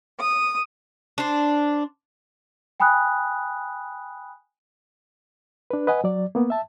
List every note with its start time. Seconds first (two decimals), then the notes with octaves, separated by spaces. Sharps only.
0.21 D#6
1.18 D4 C5
2.80 G5 G#5 B5 D#6 F#6
5.71 D4 B4
5.87 B4 D#5 F#5 G#5
6.04 F#3 D5
6.35 A#3 B3
6.50 E5 A5